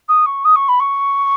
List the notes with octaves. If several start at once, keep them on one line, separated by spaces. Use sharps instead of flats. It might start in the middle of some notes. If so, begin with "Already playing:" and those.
D#6
C#6
D#6
C#6
B5
C#6